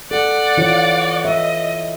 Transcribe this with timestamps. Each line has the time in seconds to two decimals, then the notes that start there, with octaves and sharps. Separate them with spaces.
0.11 A4 D5 F#5
0.57 E3 F4 C#5
1.25 D#5 E5